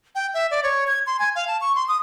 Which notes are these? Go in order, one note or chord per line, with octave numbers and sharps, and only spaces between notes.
G5
E5
D5
C#5
G#6
C6
G#5
F5
A5
C#6
C6
D#6